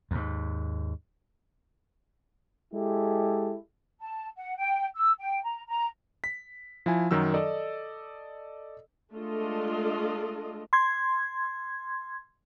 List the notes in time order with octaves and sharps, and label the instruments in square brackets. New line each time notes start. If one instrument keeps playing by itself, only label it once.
[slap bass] D#2 G#2
[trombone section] G#3 E4 G4 A4
[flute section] A5
F#5
G5
E6
G5
A#5
A#5
[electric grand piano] B6
F3 E4 G#5
F#2 D#3 F#3 E6
A4 D5 D#5
[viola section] G#3 A3 D4 F4 A4 D#5
[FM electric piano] C6 G#6